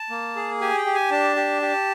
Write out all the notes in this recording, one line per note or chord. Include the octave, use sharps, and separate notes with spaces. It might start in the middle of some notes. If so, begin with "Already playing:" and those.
Already playing: A5
A#3
G#4
G4 G#5
G5
G4
G#5
D4 A5
G4
G4